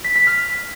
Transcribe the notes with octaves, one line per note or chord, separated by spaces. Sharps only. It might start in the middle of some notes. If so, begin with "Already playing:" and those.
B6
B6
F6